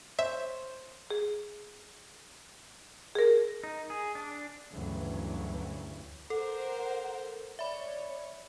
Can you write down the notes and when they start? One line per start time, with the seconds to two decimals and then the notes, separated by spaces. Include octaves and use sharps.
0.19 C5 C#5 E5
1.10 G#4
3.15 G#4 A#4
3.64 D#4
3.90 G#4
4.15 D4
4.70 D2 G2 C#3 E3 F#3
6.30 A4 A#4 C5 F#5
7.59 C#5 D5 E5 B5